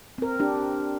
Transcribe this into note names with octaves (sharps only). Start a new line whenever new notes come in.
C4 A#4
D4 G4